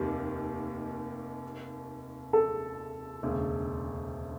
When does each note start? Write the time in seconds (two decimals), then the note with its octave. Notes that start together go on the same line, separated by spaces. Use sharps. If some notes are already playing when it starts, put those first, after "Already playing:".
Already playing: F1 D#2 D#3 G4
2.33 A4
3.23 E1 D2 C#3